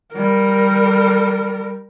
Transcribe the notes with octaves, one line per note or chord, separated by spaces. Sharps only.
G3 A#4